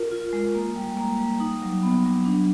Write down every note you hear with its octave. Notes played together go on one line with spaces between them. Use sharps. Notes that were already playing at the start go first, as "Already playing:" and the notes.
Already playing: F4 A#4
F4
G#3
A#3
G3
A#3
G3
D#4
F#3
B3
F#3
D4